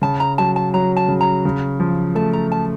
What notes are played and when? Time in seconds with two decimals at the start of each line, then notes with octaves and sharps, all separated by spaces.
0.02 C#3 A5
0.20 A#5
0.38 F#3 A5
0.56 A5
0.74 F#3 A#5
0.97 A5
1.08 C#3
1.21 A#5
1.45 C#3
1.80 F3
2.15 A3 A5
2.33 A#5
2.52 A5